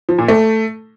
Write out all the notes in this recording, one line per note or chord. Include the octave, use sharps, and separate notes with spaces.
F3
A#2
A3